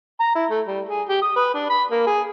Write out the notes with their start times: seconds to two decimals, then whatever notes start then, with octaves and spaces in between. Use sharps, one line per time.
0.20 A#5
0.35 E4
0.50 A3
0.66 G3
0.89 G#4
1.09 G4
1.22 D#6
1.36 B4
1.54 D4
1.70 B5
1.91 A#3
2.06 G#4